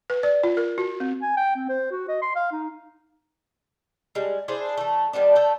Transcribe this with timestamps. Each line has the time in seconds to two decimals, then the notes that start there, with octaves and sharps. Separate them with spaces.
0.10 B4
0.23 D5
0.43 F4
0.57 A#4
0.78 F#4
1.00 C4
1.22 G#5
1.37 G5
1.56 C4
1.69 C5
1.91 F#4
2.08 D#5
2.22 C6
2.36 F5
2.52 D#4
4.15 G3 G#3
4.48 D4 E4 G#4 C5
4.77 E3 A3
5.13 D#3 G3 B3 D4
5.35 A3 G5